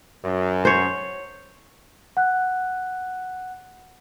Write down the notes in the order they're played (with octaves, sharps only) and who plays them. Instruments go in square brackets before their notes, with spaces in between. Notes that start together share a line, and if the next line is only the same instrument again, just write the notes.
[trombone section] F#2
[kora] C5 C#5
[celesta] F#5 F#6